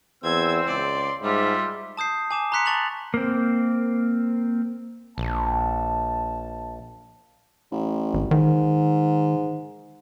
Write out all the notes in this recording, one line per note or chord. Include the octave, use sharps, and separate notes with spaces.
E2 C4 E6 G#6
C#2 D5 C6
G#2 G3 F4 E5
A5 D#6 G6 C7
G#5 D6 E7
A#5 C6 F#6 B6 C#7 E7
A5 C#6 A6 B6 F7 F#7
A#3 C4
A#1 A5
A1
G#1
G#2 D#3